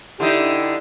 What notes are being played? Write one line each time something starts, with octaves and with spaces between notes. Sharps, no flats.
D3 D#4 E4 G4